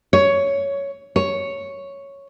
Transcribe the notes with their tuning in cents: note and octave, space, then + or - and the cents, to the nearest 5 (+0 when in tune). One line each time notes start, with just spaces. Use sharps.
C#5 +10
C#5 +0